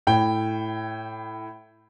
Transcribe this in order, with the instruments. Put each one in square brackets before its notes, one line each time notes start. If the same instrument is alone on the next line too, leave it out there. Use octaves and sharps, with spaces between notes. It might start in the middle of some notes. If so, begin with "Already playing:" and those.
[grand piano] A2 G5